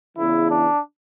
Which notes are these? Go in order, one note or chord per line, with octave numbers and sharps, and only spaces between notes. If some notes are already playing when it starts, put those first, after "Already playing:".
E2 C#3 E3 E4
D4